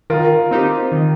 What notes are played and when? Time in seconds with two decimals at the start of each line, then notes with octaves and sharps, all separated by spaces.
0.10 D#3 F4 A#4
0.51 C4 D#4 G4
0.92 D#3